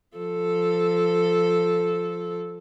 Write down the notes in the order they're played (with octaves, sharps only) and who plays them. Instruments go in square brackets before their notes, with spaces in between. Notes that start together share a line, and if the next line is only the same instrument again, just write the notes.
[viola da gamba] F3 A4